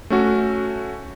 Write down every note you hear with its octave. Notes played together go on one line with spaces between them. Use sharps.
A3 C#4 F#4